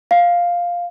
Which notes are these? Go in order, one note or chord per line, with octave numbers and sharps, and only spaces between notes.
F5